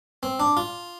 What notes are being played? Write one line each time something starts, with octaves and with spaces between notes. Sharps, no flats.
C4
D4
F4